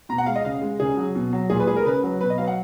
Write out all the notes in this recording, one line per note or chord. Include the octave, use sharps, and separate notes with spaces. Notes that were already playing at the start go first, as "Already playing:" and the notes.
B2 A#5
F#5
G#3 F5
D#5
C#3 F5
G#3
C#3 G#4
F#3
B2
F#3
A#2 G#4
B4
G#3 G#4
A#4
C#3 B4
F#3
B2 B4
D#5
F#3 F5
F#5